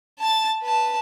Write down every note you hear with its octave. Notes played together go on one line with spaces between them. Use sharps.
A5 A6
B4 A5